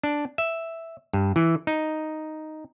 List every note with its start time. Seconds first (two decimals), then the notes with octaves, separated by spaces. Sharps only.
0.04 D4
0.38 E5
1.13 G2
1.36 E3
1.67 D#4